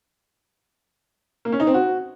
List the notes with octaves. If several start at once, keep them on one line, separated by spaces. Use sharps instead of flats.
A#3
C#4
D#4
C4
F#4